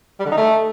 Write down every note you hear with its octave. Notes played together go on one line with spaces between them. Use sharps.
G3
D3
D#4
A3